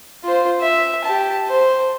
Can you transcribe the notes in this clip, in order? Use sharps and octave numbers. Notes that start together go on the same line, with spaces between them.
F4 C5
E5
G4 A5
C5